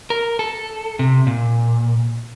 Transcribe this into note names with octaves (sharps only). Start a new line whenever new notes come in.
A#4
A4
C3
A#2